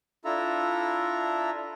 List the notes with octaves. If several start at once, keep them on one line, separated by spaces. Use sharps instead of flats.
D4 E4 F4 A4 E5 A#5